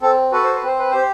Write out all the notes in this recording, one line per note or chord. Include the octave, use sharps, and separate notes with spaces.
C4 A4
F#4 A4 B4
C5
B4
C4 C5
B4
G4 C5